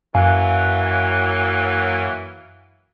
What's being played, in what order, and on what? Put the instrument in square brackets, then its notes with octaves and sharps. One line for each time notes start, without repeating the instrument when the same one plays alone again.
[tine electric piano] F#2 F5 G#5 [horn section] E3 F#3 A#3